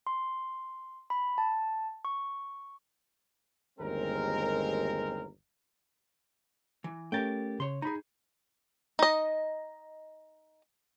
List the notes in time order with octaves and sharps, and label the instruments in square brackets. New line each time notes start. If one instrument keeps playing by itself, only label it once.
[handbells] C6
B5
A5
C#6
[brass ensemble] G1 D#2 G#3 C4 A#4
[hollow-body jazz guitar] E3
[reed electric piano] A3 C#4 A6 [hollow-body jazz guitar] G4 A#4 G5
[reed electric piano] C#3 [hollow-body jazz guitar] C#5 C6
[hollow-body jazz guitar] D#4 G#4 [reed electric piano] A#5 B5
[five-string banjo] D#4 D#5